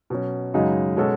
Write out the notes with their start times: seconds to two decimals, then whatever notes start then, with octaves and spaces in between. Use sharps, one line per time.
0.10 B2 F#3 C#4
0.54 F#2 C#3 G#3 D#4 F#4
0.97 B2 G#3 C#4 F#4 A4